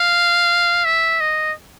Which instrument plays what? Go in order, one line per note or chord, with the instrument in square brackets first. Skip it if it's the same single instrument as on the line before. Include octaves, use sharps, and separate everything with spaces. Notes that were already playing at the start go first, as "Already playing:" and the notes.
Already playing: [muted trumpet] F5
E5
D#5